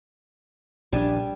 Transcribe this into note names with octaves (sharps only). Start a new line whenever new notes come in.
A#1 G3 D4 G#5 A5